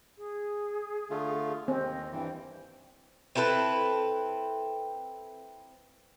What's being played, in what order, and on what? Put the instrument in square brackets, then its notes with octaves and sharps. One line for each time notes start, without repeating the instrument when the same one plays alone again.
[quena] G#4
[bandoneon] D3 A3 F4
[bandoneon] D#2 [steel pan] C4 [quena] D#5
[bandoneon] G2 E3 [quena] G5
[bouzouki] C4 E4 A4 B4